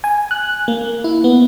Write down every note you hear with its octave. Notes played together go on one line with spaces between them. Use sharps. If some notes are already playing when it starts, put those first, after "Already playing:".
G#5
F#6
A#3
E4
B3